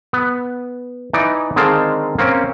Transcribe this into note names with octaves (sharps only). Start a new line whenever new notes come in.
B3
E3 D#4 D5
D3 D#3 G#3 C4 F5 A5
A#3 C4 C#4